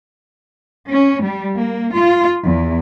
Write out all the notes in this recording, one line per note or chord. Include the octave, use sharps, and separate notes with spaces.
C#4
G3
A#3
F4
E2